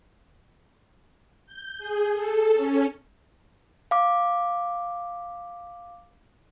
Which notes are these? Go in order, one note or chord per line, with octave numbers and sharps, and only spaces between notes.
G6
G#4
A4
C#4
F5 D6